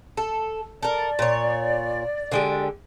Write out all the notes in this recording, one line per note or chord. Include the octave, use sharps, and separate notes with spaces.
A4
A4 A#4 D5
A#2 C#5
D3 G#3 G4